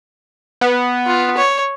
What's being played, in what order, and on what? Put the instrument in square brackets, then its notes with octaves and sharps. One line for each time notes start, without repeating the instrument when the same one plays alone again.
[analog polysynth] B3
[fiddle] F4
C#5